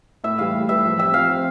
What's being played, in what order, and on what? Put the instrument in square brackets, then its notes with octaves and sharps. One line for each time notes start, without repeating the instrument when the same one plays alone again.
[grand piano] A2 [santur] E5
[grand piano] E3 G3 [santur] F5
[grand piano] A2
[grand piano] E3 G3 [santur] E5
[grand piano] F3
[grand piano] C4 G4 [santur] E5
[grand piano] F3 [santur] F5
[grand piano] C4 G4